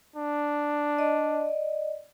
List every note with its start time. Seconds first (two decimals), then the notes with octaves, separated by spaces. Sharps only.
0.16 D4
0.98 D5 D#5